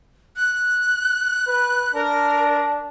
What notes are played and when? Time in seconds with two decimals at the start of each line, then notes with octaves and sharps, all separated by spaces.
0.36 F#6
1.47 B4
1.94 D4 A#4